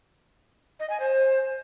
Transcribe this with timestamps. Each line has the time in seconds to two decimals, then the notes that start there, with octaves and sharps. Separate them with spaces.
0.80 D#5
0.90 G#5
1.00 C5